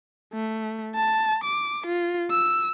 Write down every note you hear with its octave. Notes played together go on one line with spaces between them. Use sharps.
A3
A5
D6
F4
E6